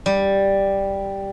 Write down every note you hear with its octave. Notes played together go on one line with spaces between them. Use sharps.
G3